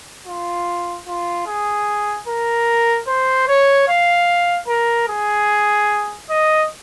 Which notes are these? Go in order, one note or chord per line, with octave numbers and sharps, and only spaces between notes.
F4
F4
G#4
A#4
C5
C#5
F5
A#4
G#4
D#5